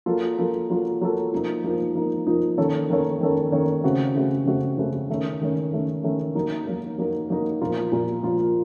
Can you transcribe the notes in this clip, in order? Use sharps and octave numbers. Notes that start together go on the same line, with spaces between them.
F#3 A#3 F4 A4
F#3 A#3 F4 A4
F#3 A#3 F4 A4
F#3 A#3 F4 A4
F3 A#3 D#4
F3 A#3 D#4
F3 A#3 D#4
F3 A#3 D#4
D#3 A#3 C#4 A4 C#5
D#3 A#3 C#4 A4 C#5
D#3 A#3 C#4 A4 C#5
D#3 A#3 C#4 A4 C#5
C#3 A3 C4 F#4
C#3 A3 C4 F#4
C#3 A3 C4 F#4
C#3 A3 C4 F#4
D#3 A3 C#4
D#3 A3 C#4
D#3 A3 C#4
D#3 A3 C#4
F#3 A#3 D#4 A#4
F#3 A#3 D#4 A#4
F#3 A#3 D#4 A#4
F#3 A#3 D#4 A#4
A#2 F3 A#3 F4 A#4
A#2 F3 A#3 F4 A#4
A#2 F3 A#3 F4 A#4